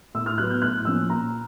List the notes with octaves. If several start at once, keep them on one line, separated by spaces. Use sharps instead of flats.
A2 E6
F6
F#3 B3 F#6
G6
A2 F#6
F3 A#3 C#4 E6
A#2 A#5